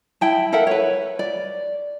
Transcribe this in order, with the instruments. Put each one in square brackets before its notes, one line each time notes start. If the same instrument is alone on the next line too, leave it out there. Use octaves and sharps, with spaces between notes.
[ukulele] E4 G5 A5
A4 A#4 E5 F#5
B4 C#5
D5